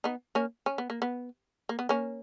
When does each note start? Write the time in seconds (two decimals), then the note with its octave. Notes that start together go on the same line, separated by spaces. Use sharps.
0.04 B3 D#4
0.35 A#3 C#4
0.66 C#4
0.78 B3
0.90 A#3
1.02 B3
1.69 A#3
1.79 B3
1.89 A#3 C#4